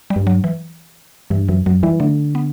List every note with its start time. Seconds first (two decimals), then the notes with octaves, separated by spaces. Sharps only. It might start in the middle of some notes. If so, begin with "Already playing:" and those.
0.10 G3
0.16 G2
0.27 F#3
0.44 E3
1.30 G2 E3
1.48 F#2 E3
1.66 F#2 F#3
1.83 E3 G3
2.00 D3 A3
2.35 B3